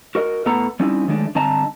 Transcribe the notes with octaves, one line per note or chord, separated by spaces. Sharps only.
F#4 A#4 D#5
A2 B3 A4 B4 F#5 A#5
G3 C4 C#4 D#4 E4
D#3 F#3 G#3 A3 D4
G2 D3 C4 D#5 A5 A#5